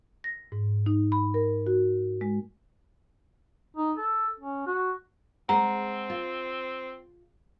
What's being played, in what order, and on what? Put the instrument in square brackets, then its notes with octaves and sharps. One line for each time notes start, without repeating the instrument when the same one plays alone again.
[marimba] A#6
G#2
D#4
B5
A#4
F#4
G#3
[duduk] D#4
A4
C#4
F#4
[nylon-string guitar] G#3 F#5 [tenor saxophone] C4 [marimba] A#5
[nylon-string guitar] F4